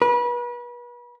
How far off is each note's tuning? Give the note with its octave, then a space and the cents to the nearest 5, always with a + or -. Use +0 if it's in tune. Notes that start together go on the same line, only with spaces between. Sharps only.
B4 -35